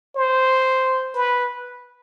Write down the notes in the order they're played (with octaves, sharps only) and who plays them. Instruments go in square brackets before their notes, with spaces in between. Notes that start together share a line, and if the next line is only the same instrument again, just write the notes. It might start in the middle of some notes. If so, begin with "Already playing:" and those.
[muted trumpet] C5
B4